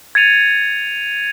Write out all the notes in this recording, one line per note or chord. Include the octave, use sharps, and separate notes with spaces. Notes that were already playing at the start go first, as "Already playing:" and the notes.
G#6 A6 C#7 D#7 F7